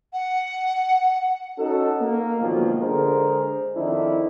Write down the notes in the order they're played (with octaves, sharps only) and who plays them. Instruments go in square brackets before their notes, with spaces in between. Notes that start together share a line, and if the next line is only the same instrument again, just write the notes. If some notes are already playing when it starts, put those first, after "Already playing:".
[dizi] F#5
[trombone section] C#4 D#4 F#4 A4
A#3
G#2 B2 D3 D#3 F3 F#3
D3 G#3 G#4 A#4 C5
F2 D#3 C4 D4 E4